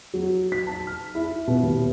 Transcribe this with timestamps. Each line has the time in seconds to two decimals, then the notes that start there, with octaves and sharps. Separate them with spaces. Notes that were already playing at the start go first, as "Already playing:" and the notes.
0.14 F#3
0.52 B6
0.67 A5
0.87 F6
1.15 E4
1.47 B2
1.63 D#2